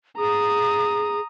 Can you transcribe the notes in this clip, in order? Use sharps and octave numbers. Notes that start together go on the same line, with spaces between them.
G#4 A#5 D#6